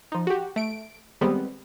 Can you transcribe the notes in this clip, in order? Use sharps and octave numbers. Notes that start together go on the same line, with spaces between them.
F3 D#4
F#4 G4
A3 D7
D#3 G3 G#3 B3 C4